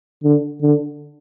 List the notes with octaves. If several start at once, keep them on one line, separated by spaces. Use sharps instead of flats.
D3
D3